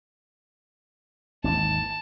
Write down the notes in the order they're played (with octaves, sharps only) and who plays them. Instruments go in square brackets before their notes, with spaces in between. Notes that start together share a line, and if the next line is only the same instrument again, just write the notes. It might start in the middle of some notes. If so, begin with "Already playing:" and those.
[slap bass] G#1 D#2 E3 [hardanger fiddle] A5